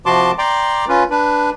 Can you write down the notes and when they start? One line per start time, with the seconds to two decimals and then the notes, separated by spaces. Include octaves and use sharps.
0.06 C3 F3 F#4 A5 C6 D6
0.38 D5 G5 A#5 C6 D6
0.88 C#4 F4 B4
1.10 D4 B4